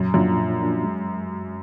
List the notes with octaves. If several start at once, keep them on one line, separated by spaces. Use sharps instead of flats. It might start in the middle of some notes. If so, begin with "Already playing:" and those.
Already playing: F#2 A#2
F#2 F3 A#3 D4 F4
A#2
F3 A#3 D4 F4
G#3